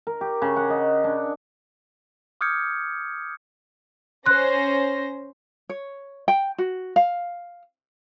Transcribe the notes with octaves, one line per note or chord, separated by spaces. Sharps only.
A#4
G4
C#3
F#5
D#5
D4
D6 D#6 F6 G6 G#6 C#7
C#4 C5 C6 F#6 A#6
C#5
G5
F#4
F5